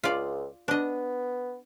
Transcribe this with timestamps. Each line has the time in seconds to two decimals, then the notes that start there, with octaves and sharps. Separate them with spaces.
0.04 C#2 F4 D5
0.68 B3 D4 D#5